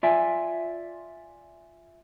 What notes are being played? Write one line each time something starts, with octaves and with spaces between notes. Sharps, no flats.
F4 D5 E5 G5 G#5